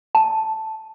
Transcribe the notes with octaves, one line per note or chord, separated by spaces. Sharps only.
A5